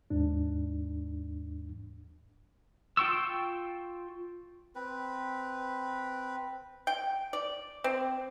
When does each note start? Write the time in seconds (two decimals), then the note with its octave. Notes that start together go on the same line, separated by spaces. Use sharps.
0.10 D#2 G#2 D4
2.97 F4 G5 C#6 E6
4.75 C4 B4
6.87 G5
7.33 D5
7.84 C4